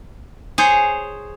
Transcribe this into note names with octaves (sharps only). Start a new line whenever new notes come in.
G#4 C5 C#5